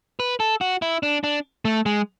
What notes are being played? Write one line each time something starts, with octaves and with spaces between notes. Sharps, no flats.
B4
A4
F#4
E4
D4
D4
A3
G#3